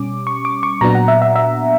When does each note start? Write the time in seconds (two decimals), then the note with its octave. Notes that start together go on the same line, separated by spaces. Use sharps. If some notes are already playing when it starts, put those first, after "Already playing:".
Already playing: B2 G3 C#4 D6
0.27 C#6
0.45 D6
0.63 C#6
0.81 A#2 F#3 B3 D4 A#5
0.95 F#5
1.08 E5
1.22 E5
1.36 E5